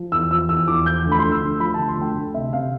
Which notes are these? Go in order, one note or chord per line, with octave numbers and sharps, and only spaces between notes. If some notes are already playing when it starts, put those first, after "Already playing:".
Already playing: F3
E2 E6
F3 E6
E2 E6
E2 D6
F3 G6
D2
B5
D3 C6
E6
D2
F3 B5
D2 A5
C6
D2 G5
D2
C3 E5
C3 F5